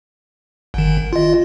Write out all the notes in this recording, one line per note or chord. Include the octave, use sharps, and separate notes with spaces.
G1 D#3
F4 D#5